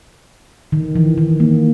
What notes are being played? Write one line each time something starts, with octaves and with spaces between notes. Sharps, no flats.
D#3
E3
D#3
A#3